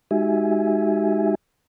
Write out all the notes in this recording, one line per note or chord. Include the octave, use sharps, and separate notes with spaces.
G#3 D#4 F#4 G4 E5 G#5